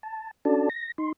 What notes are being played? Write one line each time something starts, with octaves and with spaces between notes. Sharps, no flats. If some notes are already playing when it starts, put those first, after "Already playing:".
A5
C#4 D4 F#4 A4 D5 A5
A#6
D#4 C6